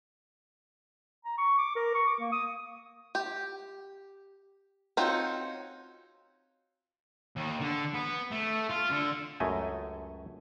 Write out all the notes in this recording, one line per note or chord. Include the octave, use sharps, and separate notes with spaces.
A#5
C#6
D6
A#4
C#6
D6
A#3
D#6
G4
C4 C#4 D#4 F4 F#4
D#2
D3
B3
A3
F4
D3
C#2 F#2 A3 D#5 G#5